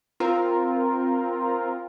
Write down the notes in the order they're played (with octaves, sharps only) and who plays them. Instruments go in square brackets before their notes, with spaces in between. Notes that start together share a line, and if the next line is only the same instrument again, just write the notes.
[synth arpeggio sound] C4 F4 A#4